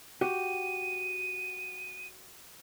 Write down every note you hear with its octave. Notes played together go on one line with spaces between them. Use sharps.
F#4 G4 D#7